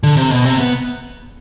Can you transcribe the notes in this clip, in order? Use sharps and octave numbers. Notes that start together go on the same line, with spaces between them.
D3
C3
B2
C3
B3